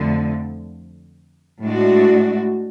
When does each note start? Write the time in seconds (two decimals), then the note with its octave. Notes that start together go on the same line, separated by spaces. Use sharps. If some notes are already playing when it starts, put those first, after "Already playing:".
Already playing: F2 D3 F3 A3
1.63 A2 G#3 D4 F#4